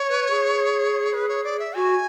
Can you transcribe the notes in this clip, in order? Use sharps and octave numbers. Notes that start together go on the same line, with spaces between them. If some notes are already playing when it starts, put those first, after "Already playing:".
Already playing: C#5
B4
G#4
B4
C#5
D5
E5
F#4 G#5